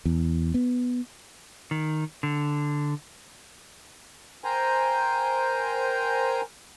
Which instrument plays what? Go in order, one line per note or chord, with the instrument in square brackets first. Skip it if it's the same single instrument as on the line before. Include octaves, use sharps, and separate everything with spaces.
[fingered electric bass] E2
B3
[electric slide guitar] D#3
D3
[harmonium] A#4 C5 G5 G#5 A#5